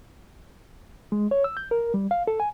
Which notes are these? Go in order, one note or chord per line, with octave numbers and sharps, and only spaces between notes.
G#3
C#5
E6
G6
A#4
G3
F5
A4
G#5